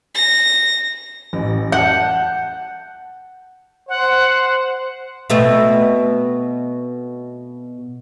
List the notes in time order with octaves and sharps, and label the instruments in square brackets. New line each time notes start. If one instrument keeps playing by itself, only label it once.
[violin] A#6
[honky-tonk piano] A1
[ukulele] F#5 [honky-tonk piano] A5 F#6 G6
[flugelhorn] C5 [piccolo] F#5
[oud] B2 A3 C4